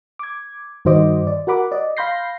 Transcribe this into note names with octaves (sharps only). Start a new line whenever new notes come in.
D6 G#6
G2 D#3 F#4 C5 D#5 D6
D5
F#4 A#4 F#5 B5 D6
D5 D#5
F5 B5 C6 G6 A#6 C7